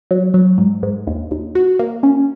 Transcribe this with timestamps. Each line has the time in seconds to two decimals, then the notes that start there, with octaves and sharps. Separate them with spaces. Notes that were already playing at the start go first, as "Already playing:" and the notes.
0.11 F#3
0.34 F#3
0.58 G#2
0.83 G#2
1.07 D#2
1.31 D#2
1.55 F#4
1.79 A#3
2.03 C#4